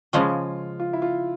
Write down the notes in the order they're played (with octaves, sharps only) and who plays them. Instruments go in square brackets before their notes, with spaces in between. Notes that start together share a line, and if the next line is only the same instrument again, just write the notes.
[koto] C#3 F3 G#3 C#4 [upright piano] F4
[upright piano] F4
E4
F4